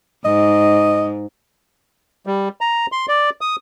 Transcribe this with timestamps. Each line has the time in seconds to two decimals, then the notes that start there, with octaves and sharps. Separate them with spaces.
0.25 G#2 D#5
2.26 G3
2.61 A#5
2.92 C6
3.08 D5
3.41 D#6